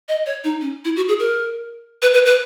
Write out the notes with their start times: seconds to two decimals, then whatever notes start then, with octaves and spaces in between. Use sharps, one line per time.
0.09 D#5
0.26 C#5
0.44 D#4
0.61 C#4
0.85 E4
0.96 F#4
1.08 G#4
1.19 A#4
2.02 B4
2.14 B4
2.26 B4